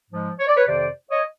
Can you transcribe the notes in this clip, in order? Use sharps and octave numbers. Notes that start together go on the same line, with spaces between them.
G#2 F3 G#3
C#5
D5
B4 C#5
F2 C3 D#3 C5 D5
C#5 D#5